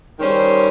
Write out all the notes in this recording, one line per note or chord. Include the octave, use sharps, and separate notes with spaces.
D#3 G3 C#4 C5